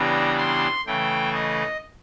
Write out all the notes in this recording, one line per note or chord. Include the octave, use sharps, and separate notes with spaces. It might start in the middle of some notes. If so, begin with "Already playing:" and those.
Already playing: C#3 E3 G3 B3 D4 A#5
C6
C#3 E3 A3 G5
D#5